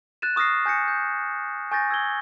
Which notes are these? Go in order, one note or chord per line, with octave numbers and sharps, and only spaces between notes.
F#6 A6 D#7 E7
C#6 D#6 F6 A#6 C7
G#5 G6 A#6 C#7
G6
G#5 C#6 G6 A6 A#6
E6 G#6 G7